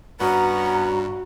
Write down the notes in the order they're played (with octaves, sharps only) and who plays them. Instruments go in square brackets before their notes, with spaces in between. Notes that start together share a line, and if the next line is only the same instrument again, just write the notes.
[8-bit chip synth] G2 [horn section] B3 C#4 [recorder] F#4 [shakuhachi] A#5